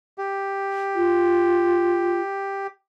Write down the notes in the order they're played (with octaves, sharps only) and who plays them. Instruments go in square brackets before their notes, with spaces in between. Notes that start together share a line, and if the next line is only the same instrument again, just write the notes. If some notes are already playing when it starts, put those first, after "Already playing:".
[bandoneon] G4
[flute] F4